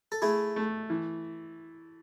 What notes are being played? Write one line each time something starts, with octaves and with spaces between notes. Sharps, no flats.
A4
A3 E4 G#4
A3
E3